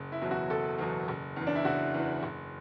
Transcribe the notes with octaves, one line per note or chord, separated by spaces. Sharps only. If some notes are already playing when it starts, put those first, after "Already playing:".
Already playing: F#1
E4
E2 B2 F#3
F#4
F#1 A4
E2 B2 F#3
F#1
E2 E3
D4
E4
F#1 F#4
E2 E3
F#1